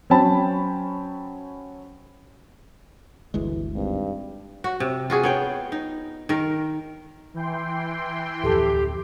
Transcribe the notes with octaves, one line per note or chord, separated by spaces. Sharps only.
F#3 C#4 C5 G5 A5 B5
G1 D2 E3 G#3
G#1 G2
F#4
C3
F4 F#4 G#4
B3 C#5 G5
D#4
D#3 A#4
E3 G5 C6
D1 F2 G4 A4 A5